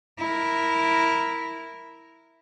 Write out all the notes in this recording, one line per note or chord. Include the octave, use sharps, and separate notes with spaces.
E4 A#4